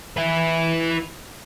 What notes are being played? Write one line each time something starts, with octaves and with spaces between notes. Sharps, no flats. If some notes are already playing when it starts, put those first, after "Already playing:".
E4 B4